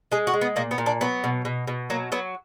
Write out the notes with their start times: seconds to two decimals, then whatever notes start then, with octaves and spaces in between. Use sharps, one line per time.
0.12 G#3 G#4
0.27 F#4
0.33 G#3
0.41 B3
0.56 A#2 A#3
0.71 B3
0.78 A#2
0.86 D4
1.01 F#3 B3
1.24 B2
1.45 B2
1.67 B2
1.90 F#3 A#3
2.12 F#3 B3